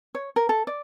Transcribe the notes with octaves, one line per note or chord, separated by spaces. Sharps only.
C#5
A#4
A4
D5